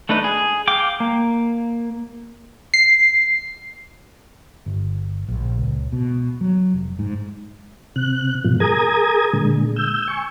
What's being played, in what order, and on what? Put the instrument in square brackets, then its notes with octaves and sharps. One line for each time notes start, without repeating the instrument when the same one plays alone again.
[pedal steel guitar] A3 D4 D#4 B4
G#4
F5 G5 D6
A#3
[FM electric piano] C7
[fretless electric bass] G1
A#1
C#2
B2
F#3
F1
G#2
[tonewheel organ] C3 F#6
G#2 B2 F3
G#4 A#4 A#5 D#6 G#6
A#2 D3 G#3
E6 G6
G#5 C#6